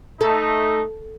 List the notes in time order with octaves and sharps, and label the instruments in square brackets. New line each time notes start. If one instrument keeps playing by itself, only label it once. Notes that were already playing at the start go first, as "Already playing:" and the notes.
[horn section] A3 D#4 [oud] A4